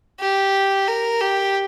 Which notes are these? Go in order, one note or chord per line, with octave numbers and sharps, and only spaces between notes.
G4
A#4
G4